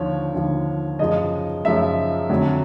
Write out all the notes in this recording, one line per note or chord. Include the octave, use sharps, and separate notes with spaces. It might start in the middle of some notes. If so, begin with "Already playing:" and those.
Already playing: D#2 D3 F3 C#5
D#2 D3 F3
F#2 C#3 F3 D#5
F#2 C#3 F3 E5
F2 D3 F#3